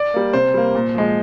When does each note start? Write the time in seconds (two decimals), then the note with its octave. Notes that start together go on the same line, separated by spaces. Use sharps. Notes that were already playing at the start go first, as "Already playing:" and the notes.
Already playing: D5
0.14 G3 A#3
0.33 C3 C5
0.54 G3 A#3
0.75 A#2
0.95 F3 G#3